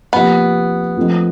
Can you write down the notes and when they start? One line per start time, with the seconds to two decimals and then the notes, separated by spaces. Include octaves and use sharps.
0.13 C3 F3 A#3 B3 D#4
0.97 F3 A3 C4 D#4